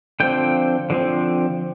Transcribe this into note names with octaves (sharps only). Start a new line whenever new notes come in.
D3 F3 C4 G5
D3 F3 C4